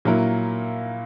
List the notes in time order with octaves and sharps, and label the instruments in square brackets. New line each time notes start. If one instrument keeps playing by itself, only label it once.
[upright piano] A#2 F#3 A#3 E4 A#4